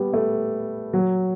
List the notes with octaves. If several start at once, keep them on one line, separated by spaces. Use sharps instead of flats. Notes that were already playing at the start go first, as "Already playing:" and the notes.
Already playing: G3 B3
A3
F#3